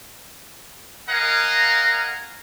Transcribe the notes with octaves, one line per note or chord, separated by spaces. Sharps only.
A#4 D#5 F5 F#5 G#5 A#5